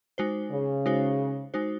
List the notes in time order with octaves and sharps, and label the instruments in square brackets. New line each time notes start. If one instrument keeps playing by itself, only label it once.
[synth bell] G#3 D#4 F#4 C5
[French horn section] C#3
[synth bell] G#3 D#4 F#4 C5
G#3 D#4 F#4 C5